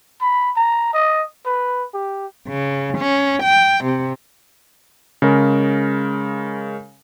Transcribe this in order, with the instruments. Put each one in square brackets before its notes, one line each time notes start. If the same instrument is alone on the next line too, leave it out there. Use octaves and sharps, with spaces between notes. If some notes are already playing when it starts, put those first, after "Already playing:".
[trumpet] B5
A#5
D#5
B4
G4
[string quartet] C#3
C#4
G5
C3
[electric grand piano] C#3 G#3 A#4